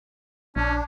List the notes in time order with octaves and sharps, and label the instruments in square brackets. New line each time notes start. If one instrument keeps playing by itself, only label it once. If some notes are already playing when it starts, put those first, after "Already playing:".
[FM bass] A#1 [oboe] C#4 [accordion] D4